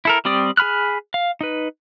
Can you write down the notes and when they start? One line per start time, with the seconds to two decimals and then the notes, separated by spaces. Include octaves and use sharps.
0.05 E4 A4 A#4
0.25 G3 C4 G4 D5 D#6
0.57 G#4 G#5 B5 F6 F#6
1.14 F5
1.41 D#4 B4